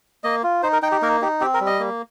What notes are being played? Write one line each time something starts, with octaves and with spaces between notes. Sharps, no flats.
A#3 D#5
F4
D#4 C5
A#4
D#4 G5
G4
A#3 A#4
D#4 G4
C4 G4
A#4
G3
D#5
A#3